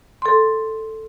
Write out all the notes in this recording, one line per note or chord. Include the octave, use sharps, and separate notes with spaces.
A4 C6